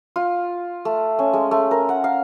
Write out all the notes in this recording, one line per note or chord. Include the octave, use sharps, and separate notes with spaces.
F4
A3
C#4
G#3
A3
A#4
F#5
F5